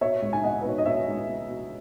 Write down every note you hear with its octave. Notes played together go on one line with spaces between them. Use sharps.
B2 C#5 E5
C#2
G#5
B2 D#5 F#5
B4
B2 C#5
D#5
B2 C#5 E5
C#2
B2
B2